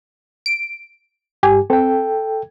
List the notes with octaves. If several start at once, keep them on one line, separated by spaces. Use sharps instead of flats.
D7
G2 G4 G#5
C4 A4 G5